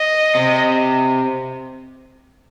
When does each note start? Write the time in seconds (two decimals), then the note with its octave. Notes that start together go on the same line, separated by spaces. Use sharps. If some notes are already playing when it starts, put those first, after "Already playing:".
Already playing: D#5
0.35 C3